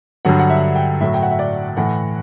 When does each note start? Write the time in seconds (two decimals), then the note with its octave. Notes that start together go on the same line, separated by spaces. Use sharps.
0.25 G2 D3 F#3 F#5
0.40 F#5
0.50 E5
0.76 G5
1.01 A2 F#3 E5
1.14 G5
1.22 F#5
1.31 E5
1.39 D5
1.77 A2 E3 F#5